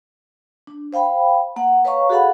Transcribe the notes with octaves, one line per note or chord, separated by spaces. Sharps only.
D4
C5 F5 G5 B5
A#3 F#5
B4 C#5 D#5 F5 A#5 C#6
F#4 G#4 A4 F5 F#5 B5